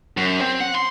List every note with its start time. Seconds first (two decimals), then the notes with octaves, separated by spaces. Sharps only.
0.17 F#2
0.41 C4
0.60 F#5
0.75 C6